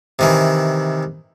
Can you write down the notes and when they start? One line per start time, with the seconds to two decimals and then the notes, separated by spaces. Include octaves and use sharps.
0.19 C3 D#3 E3